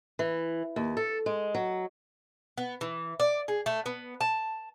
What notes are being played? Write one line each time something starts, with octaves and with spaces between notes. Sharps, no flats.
E3
D#2
A4
G#3
F#3
B3
E3
D5
G#4
A3
B3
A5